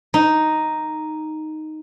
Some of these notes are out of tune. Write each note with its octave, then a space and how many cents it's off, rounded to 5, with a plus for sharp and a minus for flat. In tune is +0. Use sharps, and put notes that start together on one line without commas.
D#4 +0